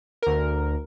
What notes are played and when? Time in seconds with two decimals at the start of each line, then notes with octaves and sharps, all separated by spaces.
0.22 D2 A#4